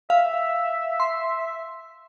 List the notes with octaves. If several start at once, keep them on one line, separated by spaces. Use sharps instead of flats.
E5 F5
C6